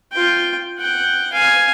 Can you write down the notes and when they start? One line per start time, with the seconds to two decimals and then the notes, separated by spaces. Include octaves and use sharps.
0.12 F4 G5
0.78 F#5 G5
1.32 F5 G#5